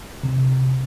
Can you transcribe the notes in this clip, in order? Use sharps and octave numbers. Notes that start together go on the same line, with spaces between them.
C3